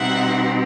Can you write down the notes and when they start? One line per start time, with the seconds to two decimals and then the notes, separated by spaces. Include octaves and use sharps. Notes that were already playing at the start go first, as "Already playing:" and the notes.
Already playing: B2 G3 C4 D#4 E5 F#5